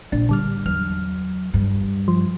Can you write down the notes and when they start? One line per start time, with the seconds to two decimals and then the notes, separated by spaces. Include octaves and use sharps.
0.12 A#1 D4
0.29 A2 D3 G3 F6
0.66 E2 F#3 F6
1.54 G2
2.08 F3